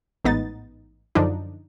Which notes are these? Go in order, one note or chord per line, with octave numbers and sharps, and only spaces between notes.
A1 G#2 B3 D#4 A6
F#2 D3 F3 D4 D#4